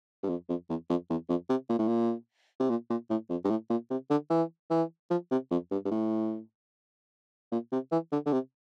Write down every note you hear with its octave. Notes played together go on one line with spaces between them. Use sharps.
G2
F2
F2
E2
F2
E2
F2
C3
A#2
A2
A#2
C3
A#2
A#2
A2
F2
G2
A2
A#2
C3
D3
E3
E3
F3
C3
F2
G2
G2
A2
A#2
C3
E3
D3
D3
C3